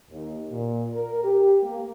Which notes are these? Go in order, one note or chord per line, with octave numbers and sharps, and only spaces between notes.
D#2
A#2
A#4
G4
A#3